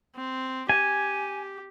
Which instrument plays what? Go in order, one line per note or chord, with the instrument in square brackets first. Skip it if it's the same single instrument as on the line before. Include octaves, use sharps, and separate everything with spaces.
[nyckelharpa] C4
[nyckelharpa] G4 [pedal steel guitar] G#5